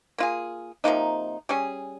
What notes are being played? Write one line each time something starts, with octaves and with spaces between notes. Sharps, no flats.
A#3 F4 G#4
C3 F3 A#3 D#4
G3 C#4 G#4